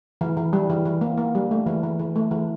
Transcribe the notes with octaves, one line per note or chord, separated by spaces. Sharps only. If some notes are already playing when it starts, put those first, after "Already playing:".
E3
E3
G3
E3
E3
A#3
A#3
G3
A3
E3
E3
E3
A3
E3